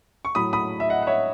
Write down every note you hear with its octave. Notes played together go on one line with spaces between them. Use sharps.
C#6
A2 F#3 B5 D#6
B5 D#6
E5
D#5 F#5
F#5
C#5 E5